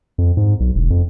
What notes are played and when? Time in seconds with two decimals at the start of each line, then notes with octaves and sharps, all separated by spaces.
0.18 F2
0.37 G#2
0.60 B1
0.75 E1
0.90 F2